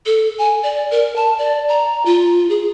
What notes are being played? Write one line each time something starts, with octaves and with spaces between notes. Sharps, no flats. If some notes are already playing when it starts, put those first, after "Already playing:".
A4
G#5
D5
A#4
A5
D5
A#5
F4
G#4